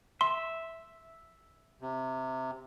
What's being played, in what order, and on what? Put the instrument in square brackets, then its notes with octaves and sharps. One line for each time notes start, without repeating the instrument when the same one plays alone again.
[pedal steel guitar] E5 [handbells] C6
[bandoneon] C3